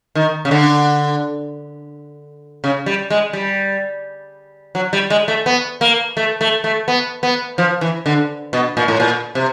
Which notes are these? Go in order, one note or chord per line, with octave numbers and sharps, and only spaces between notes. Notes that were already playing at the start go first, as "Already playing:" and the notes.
D#3
C#3
D3
C#3
G3
G#3
G3
F#3
G3
G#3
A3
B3
A#3
A3
A3
A3
B3
B3
F3
E3
D3
B2
A#2
A2
A#2
C3